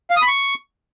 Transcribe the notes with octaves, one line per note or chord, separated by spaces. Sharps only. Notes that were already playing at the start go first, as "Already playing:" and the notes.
F5
D#6
B5
C#6